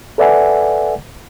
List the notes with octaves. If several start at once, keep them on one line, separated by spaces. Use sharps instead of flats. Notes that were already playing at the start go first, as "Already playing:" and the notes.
A4 B4 D5 E5 F#5 G#5